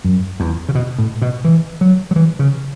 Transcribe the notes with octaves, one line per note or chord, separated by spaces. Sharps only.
F#2
E2
C#3
B2
A2
B2
E3
F#3
F#3
E3
C#3